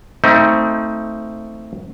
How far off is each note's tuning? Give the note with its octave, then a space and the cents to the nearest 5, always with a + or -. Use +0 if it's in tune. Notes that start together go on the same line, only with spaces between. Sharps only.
A3 +20 C4 +0 D#4 +30